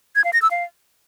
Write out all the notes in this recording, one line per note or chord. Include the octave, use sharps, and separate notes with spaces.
G#6
F5
A#6
E6
F5